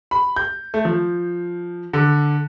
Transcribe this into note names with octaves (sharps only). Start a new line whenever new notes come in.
B5
G6
A3
F3
D3